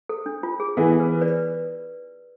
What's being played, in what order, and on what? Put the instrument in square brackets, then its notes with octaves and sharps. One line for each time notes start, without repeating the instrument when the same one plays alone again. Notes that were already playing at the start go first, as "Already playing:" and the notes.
[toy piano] A4
D4
F4
G#4
[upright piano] E3 B3 E4 G#4 [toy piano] A4
[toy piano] B4
B4 D5